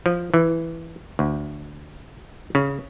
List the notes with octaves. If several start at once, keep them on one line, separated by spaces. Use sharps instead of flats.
F3
E3
D2
C#3